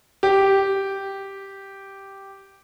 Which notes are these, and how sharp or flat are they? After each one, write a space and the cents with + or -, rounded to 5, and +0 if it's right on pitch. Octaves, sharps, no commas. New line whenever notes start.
G4 -5